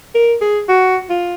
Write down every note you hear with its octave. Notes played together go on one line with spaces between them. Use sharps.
A#4
G#4
F#4
F4